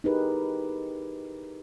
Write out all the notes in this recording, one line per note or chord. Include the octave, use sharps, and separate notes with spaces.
D#4 E4 G4 G#4 A#4 B4